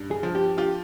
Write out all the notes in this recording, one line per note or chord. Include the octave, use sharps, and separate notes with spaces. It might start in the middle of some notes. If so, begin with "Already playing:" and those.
Already playing: G2
G#4
F3
G4
F4 G4